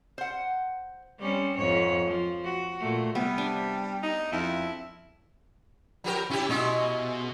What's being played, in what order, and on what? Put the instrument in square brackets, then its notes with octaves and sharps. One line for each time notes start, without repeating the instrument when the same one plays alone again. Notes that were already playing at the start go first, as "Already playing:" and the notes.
[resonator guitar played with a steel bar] C5 F#5
[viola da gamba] G3 C4 C#4
F2 G#2 C#5
F3
F#4
A#2 A3
[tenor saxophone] C3 [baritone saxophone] G3 [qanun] B3
[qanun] D4
[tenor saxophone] D#4
[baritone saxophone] F2 [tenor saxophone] E4
[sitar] F3 G4 A#4 [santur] B5
[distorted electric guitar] C#4 D4 [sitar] E4 G4
[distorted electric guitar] B2 [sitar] G#3 C#4 E4 [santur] F#4 D#5